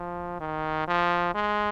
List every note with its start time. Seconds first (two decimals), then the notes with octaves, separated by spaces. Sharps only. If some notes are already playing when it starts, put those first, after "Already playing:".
Already playing: F3
0.40 D#3
0.88 F3
1.35 G#3